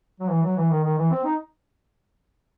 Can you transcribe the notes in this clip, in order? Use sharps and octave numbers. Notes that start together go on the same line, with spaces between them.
F#3
E3
F#3
E3
D#3
D#3
E3
C4
D#4